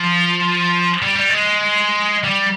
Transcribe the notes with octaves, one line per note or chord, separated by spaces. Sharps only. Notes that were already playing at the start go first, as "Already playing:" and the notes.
Already playing: F3
G3
G3
G#3
G3